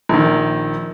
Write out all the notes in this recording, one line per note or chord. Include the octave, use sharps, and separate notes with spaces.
A#1 D#3